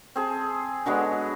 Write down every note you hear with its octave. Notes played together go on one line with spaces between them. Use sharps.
C4 G#4 A5
D3 F#3 G#3 B3